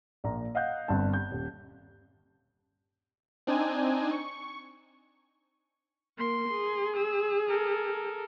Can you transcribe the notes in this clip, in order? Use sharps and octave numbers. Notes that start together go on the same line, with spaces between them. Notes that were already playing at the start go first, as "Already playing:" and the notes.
A#1 A#2 A#5
D#5 F5 F#5 F#6 G6
G1 G2 C4 A5
G6
D#1
C4 D4 D#4 G#5
C#6
A#3 C6
G#4
E6
A4 A#4